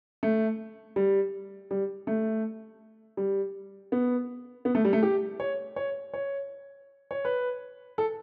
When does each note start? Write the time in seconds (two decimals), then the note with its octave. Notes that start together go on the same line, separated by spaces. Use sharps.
0.23 A3
0.96 G3
1.71 G3
2.07 A3
3.17 G3
3.92 B3
4.65 B3
4.75 A3
4.85 G3
4.93 A3
5.03 G4
5.40 C#5
5.76 C#5
6.14 C#5
7.11 C#5
7.25 B4
7.98 A4